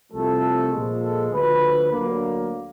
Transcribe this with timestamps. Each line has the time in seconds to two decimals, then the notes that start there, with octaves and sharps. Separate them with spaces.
0.11 C2 C3 F3 A3 A4
0.71 A#2 F3 G#3
1.01 A4
1.32 D2 D3 F3 B4
1.91 D2 D3 F#3 A#3